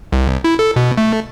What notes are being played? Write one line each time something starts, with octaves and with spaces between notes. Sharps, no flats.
C2
E4
A4
B2
A3